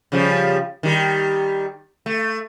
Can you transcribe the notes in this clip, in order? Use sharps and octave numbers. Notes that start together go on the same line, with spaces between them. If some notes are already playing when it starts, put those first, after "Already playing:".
C#3 F3 G3
D#3 G3
A3